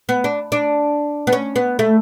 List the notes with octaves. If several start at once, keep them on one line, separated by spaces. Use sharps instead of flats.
B3
D4
D4
B3
C#4
B3
A3